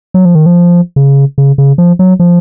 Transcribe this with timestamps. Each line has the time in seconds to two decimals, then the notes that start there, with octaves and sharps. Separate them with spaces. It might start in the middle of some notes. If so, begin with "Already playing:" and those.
0.14 F#3
0.25 F3
0.35 D#3
0.46 F3
0.96 C#3
1.38 C#3
1.58 C#3
1.78 F3
1.99 F#3
2.20 F3